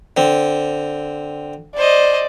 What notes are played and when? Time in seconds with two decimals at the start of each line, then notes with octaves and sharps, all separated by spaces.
0.17 D3 C4
1.76 C5 D5 D#5